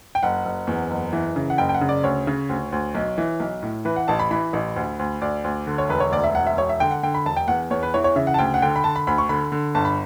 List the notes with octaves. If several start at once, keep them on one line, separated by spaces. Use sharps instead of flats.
G5
F#1 F#5
F#1
E2
F#1
E3
C#3
F#5
F#1 G5
G5
F#5
C#3
D5
D2 C#5
C#3
D2
D2
B1
E3
B1
A2
E3 B4
F#5
A1 A5
B5
E3 B5
A1
D2
D2
D2 D5
D2
D3
C#5
E1 B4
C#5
D2 D5
E5
E1 F#5
E5
E1 C#5
E5
D3 G5
F#5
D3 G5
B5
E1 A5
G5
E2 F#5
E2 C#5
B4
E3 C#5
C#5
C#3 E5
F#5
A5
D2 G5
F#5
D3 G5
B5
D3 A5
B5
D2 B5
C#6
D3 B5
D3
G1 A5
B5